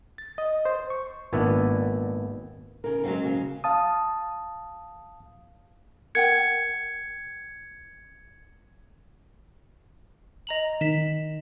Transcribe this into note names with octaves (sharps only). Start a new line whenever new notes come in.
A6
D#5
C5
C#6
G#1 A#2 B3 D4 E5
C#3 A#4
F#3 G#3 A#3 C4 C#4
C#3
F5 A5 D#6
A#4 F#5 G5 G#6 C#7
D#5 A#5 F#7
D#3 B6 E7